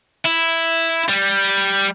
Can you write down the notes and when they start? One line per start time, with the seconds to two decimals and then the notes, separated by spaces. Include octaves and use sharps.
0.25 E4
1.09 G3